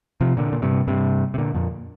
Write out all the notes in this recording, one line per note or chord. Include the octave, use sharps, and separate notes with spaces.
C3 F3
A#2 D3
A#2
G2 C3
G2 C3
C3
A#2 D3
F2 A#2